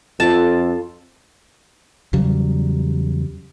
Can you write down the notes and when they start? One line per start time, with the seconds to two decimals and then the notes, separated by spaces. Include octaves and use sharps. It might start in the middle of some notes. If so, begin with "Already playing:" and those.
0.20 F2 F4 A4 A5
2.13 E2 C#3 F#3 G3